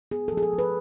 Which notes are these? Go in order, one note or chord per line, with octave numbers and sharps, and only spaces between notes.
B3 G#4
F3 A4
G#4
A4
F3
B4